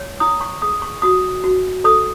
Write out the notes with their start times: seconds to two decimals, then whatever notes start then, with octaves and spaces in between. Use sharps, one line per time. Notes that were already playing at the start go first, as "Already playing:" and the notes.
Already playing: C#5
0.20 E4 D#6
0.41 C#6
0.62 G#4 D#6
0.82 C#6
1.02 F#4 D#6
1.44 F#4
1.84 A4 D#6